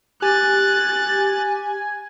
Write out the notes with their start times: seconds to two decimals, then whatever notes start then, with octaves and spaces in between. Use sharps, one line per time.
0.22 G4 G#5 F#6 A6